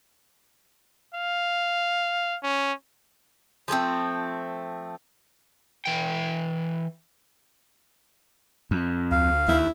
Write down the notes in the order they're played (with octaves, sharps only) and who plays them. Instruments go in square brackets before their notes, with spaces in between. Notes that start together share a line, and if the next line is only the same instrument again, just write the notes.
[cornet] F5
C#4
[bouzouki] F3 G#3 A3 C4
[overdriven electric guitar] E3 G5
[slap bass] F2
[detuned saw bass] D2 [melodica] F5
[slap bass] D#2 [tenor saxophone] E4